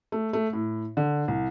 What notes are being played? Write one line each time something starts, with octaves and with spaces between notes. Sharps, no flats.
A3
A3
A2
D3
C2